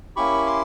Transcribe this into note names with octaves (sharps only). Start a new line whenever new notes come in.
A#3 C#4 E4 G4 B5 C#6
C6 D6